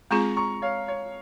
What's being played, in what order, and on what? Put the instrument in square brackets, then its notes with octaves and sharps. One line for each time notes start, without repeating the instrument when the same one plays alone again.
[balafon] G#3 C4 F4 G#4 [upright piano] A#5 C#6
[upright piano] A#5 C#6
C#5 F5
C#5